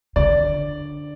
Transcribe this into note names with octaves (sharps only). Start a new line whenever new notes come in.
D3 D5